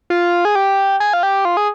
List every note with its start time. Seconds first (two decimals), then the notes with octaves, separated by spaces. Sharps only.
0.10 F4
0.45 G#4
0.55 G4
1.00 G#4
1.13 F4
1.23 G4
1.45 F4
1.57 G#4